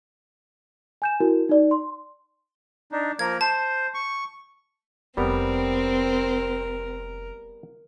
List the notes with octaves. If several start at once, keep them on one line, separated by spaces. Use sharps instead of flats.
G#5 G6 E7
E4 F#4 A#4
D#4 D5
C6
D4 D#4
F3 A#3 A#4 G#6
C5 A5
C#6
F1 G3 B3 C4 A#4